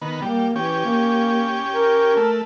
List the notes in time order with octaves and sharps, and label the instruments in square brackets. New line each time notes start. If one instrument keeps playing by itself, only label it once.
[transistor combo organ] D#3 B3
[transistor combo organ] G3 [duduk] A#3
[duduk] E3 [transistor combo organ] C#4 G4
[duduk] A#3
A#4
[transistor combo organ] A3